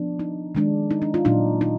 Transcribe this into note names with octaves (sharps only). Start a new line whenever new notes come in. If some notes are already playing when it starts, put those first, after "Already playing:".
Already playing: F3 B3 D4
D#4
D#3 G#3 D4
D#4
D4
F4
A#2 F#3 D4 D#4
D#4